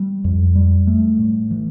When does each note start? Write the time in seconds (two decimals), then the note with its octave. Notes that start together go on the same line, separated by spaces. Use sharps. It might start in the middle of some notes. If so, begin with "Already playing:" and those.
Already playing: G3
0.24 F2
0.55 G3
0.87 A3
1.19 A2
1.51 E3